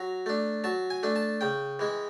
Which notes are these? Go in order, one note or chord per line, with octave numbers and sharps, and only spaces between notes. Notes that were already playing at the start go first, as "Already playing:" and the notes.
Already playing: F#3 A#5
A3 D4
F#3 A5
G#5
A3 D4
A5
C#3 G5
E3 G#3